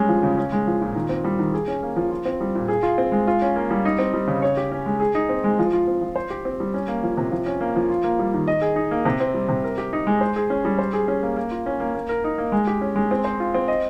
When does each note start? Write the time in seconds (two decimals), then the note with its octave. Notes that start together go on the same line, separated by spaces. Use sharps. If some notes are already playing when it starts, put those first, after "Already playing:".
Already playing: G3 G#3 C#4
0.09 F3
0.23 C#3
0.38 C#4
0.52 G#3
0.67 F3
0.81 A#2
0.95 D#3
1.09 C4
1.24 G3
1.39 D#3
1.54 G#4
1.68 C#4
1.83 A#3
1.96 F3
2.11 F4
2.26 C4
2.40 G3
2.55 A#2
2.68 G#4
2.83 F4
2.98 C4
3.12 G#3
3.27 F4
3.42 C#4
3.56 A#3
3.71 G3
3.85 D#4
3.99 C4
4.14 G3
4.27 C#3
4.42 C#5
4.57 G4
4.72 C#4
4.86 G#3
5.00 G#4
5.15 D#4
5.29 C4
5.44 G#3
5.59 F3
5.73 F4
5.87 C4
6.01 F3
6.16 C5
6.30 G4
6.45 C4
6.60 G3
6.74 C#4
6.88 A#3
7.03 F3
7.17 C3
7.32 F3
7.46 C#4
7.61 A#3
7.76 F3
7.89 F4
8.04 A#3
8.19 G3
8.34 D#3
8.48 D#5
8.61 G#4
8.76 D#4
8.91 A#3
9.05 C3
9.20 C4
9.34 G3
9.48 C3
9.64 A#4
9.78 G4
9.93 D#4
10.07 G#3
10.21 C5
10.36 G#4
10.50 C#4
10.65 G3
10.79 C5
10.93 G#4
11.08 C#4
11.23 A#3
11.36 A#3
11.51 F4
11.66 C#4
11.80 A#3
11.94 A#3
12.09 A#4
12.24 D#4
12.38 A#3
12.52 G#3
12.67 G4
12.81 C#4
12.96 G#3
13.11 C4
13.25 C5
13.40 F4
13.54 C4
13.68 D#5